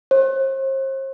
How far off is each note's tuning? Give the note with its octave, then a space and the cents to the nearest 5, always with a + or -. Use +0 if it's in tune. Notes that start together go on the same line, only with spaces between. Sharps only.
C5 +40